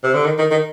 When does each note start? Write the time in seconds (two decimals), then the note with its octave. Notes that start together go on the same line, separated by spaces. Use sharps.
0.03 C3
0.14 D3
0.25 D#3
0.38 D#3
0.51 D#3